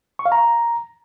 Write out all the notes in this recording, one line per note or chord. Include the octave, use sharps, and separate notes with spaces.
C#6
F5
A#5